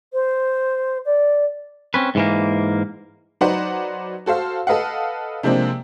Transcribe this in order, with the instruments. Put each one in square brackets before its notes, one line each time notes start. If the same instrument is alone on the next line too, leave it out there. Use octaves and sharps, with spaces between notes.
[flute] C5
D5
[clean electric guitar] C4 C#4 B4
G#2 E3 A#3
[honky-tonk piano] F#3 D#4 B4 C5 D5 F#5
F#4 A4 C5 F5
A4 B4 D#5 F5 F#5
C3 F3 G#3 A#3 C4 D4